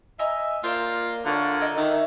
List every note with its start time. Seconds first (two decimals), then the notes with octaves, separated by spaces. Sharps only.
0.19 D#5 E5 G#5 A#5
0.64 A#3 F4 C5 D5
1.25 D3 F4 A#4 C#5
1.61 E4 D#5 E6
1.77 D#3 E5